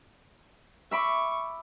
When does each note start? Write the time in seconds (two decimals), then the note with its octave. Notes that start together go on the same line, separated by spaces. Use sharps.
0.91 E5 B5 C#6 D6